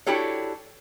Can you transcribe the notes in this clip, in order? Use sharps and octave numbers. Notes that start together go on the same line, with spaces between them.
D4 E4 F#4 G4 A4 C#5